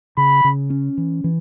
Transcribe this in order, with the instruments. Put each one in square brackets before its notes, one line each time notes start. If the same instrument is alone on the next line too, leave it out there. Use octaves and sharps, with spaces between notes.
[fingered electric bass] C#3 [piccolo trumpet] B5
[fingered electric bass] C#3
C#4
E3
E3